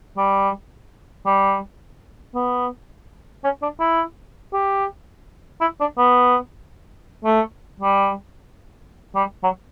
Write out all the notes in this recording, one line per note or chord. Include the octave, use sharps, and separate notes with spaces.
G3
G3
B3
C#4
D4
E4
G4
E4
D4
B3
A3
G3
G3
F#3